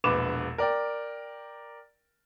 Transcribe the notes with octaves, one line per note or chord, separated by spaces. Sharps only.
E1 A#1 B4 D6 E7
A#4 D5 G5